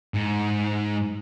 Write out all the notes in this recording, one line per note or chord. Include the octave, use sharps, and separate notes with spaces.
G#2